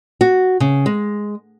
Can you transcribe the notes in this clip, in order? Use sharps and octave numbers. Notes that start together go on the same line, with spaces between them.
F#4
C#3
G#3